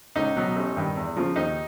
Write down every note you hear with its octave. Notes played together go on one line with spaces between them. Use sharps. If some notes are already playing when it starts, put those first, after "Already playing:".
C#2 D#4
B2 F#3
A1
G2 D#3
E2
C#3 F3
D#2 D#4